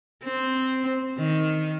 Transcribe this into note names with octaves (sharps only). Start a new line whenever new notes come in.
C4
D#3